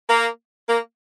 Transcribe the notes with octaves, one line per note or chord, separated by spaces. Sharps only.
A#3
A#3